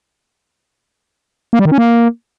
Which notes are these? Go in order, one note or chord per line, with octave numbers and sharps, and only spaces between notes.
A#3
G3
D#3
C#4
A#3